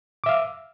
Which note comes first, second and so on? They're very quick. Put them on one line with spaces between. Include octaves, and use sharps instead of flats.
D6 E5 F5